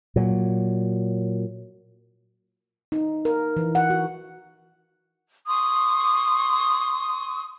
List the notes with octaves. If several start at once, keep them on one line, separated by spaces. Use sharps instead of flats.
A#2 F#3
D#4
A#4
E3
F#5
F#4
C6 C#6 D#6